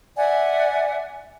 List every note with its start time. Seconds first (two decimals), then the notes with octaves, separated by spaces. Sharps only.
0.17 D5 E5 F#5 G#5